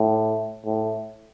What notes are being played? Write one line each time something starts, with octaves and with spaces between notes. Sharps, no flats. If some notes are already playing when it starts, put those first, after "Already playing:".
Already playing: A2
A2